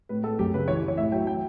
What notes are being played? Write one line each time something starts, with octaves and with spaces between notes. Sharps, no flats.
A2 B4
A2 A4
F#2 G4
C#3 B4
E3 C#5
E3
C#5
A2 E5
F#3 G5
G5